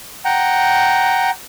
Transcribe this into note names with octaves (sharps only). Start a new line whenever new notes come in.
F#5 G5 A#5